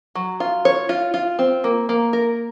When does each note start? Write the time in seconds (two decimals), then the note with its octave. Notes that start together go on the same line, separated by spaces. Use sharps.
0.15 F#3
0.40 F4
0.65 C#5
0.89 F4
1.14 F4
1.39 C4
1.64 A#3
1.89 A#3
2.13 A#4